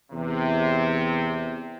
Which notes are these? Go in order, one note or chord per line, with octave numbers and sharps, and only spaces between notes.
E2 C3